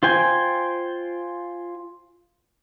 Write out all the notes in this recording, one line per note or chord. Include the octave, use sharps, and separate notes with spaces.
F4 C5 G5 G#5